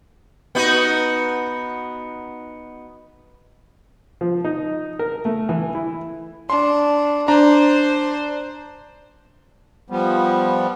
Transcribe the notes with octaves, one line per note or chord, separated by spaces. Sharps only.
B3 D#4 F#4
F3
D#4
A#4
A3
E3
E4
D4 C6
D4 C5 A#5
F3 G3 B3